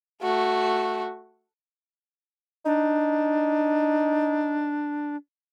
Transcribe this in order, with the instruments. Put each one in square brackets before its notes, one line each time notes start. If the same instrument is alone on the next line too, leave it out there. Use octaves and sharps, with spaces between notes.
[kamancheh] A3 F#4
[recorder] D4 [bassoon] D#4